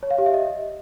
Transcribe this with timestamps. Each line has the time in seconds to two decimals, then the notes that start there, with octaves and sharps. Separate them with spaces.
0.03 C#5
0.11 F5
0.18 G4
0.26 E5
0.34 D#5